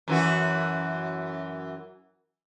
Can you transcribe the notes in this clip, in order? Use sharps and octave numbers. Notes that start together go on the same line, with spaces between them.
F#2 E3 F#4